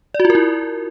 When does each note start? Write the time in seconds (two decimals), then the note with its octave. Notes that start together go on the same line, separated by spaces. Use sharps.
0.14 D5
0.20 F#4
0.25 F4
0.30 A#4
0.35 E4